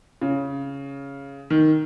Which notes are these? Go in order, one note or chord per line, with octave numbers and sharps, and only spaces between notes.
C#3
D#3